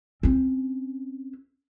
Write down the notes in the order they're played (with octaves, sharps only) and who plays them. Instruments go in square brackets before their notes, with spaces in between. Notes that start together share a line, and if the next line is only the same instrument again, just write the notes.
[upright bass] C4 C#4